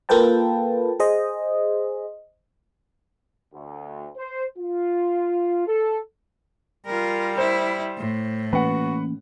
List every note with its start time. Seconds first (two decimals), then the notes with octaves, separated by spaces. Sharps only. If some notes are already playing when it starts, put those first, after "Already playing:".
0.09 A#3 F4 A4 B4 G5 A5
1.00 G#4 C5 D#5
3.53 D2
4.17 C5
4.58 F4
5.67 A4
6.86 G3 F4 A#4
7.38 E4 C5
7.98 A2
8.53 E3 A#3 C#4 F#4 B4 F#5